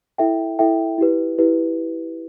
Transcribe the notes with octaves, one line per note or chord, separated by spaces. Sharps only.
E4 A4 E5 G5
E4 A4 E5 G5
E4 G4 B4
E4 G4 B4